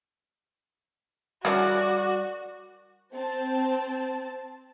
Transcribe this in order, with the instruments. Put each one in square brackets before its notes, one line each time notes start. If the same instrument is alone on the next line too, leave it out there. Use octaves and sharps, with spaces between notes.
[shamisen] C#3 E3 F#3 [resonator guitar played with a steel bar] G3 A#4 D5 [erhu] F#4 [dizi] D6
[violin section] C4 A5